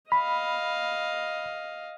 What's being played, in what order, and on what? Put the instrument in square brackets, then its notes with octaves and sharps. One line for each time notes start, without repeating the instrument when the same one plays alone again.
[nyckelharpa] D#5 F5 [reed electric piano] B5